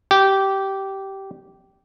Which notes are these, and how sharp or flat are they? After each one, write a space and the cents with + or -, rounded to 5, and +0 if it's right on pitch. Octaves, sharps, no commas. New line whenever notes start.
G4 -15